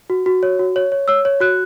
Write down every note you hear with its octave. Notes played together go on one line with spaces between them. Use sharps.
F#4
F#4
C#5
F#4
C#5
C#5
C#5 E6
C#5
F#4 F#6